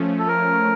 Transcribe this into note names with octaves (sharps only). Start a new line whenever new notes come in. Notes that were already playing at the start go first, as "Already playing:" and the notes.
Already playing: F3 A3 C#4
A4
A#4